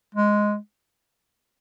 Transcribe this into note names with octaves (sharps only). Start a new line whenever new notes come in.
G#3